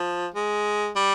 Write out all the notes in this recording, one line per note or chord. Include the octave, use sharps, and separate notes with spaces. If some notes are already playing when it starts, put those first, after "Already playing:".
Already playing: F3
G#3
G3